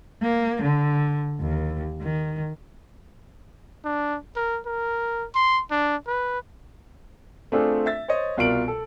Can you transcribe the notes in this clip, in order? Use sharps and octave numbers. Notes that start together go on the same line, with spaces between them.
A#3
D3
D#2
D#3
D4
A#4
A#4
C6
D4
B4
A3 C4 D4 F4 G#4 A4
E5 A6
C5 C#5 D#5
C2 B2 F4 A#4 D7 F#7
A4